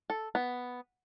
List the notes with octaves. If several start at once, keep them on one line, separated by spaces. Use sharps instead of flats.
A4
B3